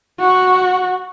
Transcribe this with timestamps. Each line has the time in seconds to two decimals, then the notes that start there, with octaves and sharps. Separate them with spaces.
0.20 F#4